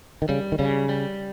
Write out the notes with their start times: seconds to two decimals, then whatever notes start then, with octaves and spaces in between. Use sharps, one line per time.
0.22 D#3
0.29 C#3 G3
0.52 D#3
0.59 C#3 G3
0.89 G3